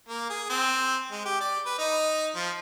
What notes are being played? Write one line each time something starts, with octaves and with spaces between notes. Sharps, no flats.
A#3
G#4
C4
G#3
G4
D5
B4
D#4
F3